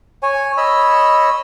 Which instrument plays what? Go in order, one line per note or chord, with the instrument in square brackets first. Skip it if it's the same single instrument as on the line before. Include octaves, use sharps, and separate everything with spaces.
[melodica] C#5 G#5
C#5 D#5 B5 E6